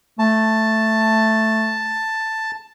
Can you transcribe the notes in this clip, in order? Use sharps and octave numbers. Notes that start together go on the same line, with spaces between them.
A3 A5